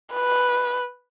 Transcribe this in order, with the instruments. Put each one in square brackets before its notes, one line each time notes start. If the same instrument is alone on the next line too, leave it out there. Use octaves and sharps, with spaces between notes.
[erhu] B4